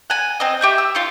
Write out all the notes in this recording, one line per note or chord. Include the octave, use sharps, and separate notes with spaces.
F#5 G#5
C4 D#5
G4 E5 G6
E6
D#4 F4